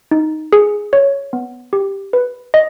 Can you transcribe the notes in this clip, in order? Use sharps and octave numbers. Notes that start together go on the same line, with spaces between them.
D#4
G#4
C#5
B3
G4
B4
D#5